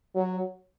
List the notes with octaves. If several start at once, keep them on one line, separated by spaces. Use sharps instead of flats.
F#3